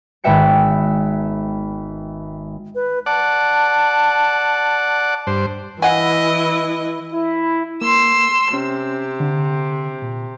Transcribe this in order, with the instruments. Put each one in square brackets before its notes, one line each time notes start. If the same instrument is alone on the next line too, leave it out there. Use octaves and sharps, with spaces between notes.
[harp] G#1 B3 B4 E5 G5 C#7
[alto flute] B4
[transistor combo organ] D5 F#5 [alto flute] A5
[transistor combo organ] G2 C5
[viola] E3 E4 [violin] D#5 [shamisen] F5 F#5 G#5
[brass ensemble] E4
[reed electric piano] A#3 [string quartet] C6 E6
[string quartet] C3 [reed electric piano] C#4
[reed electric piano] D3
A#2